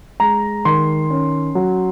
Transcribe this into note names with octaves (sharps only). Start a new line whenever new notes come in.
G#3 A#5
D#3 C6
C#4
F#3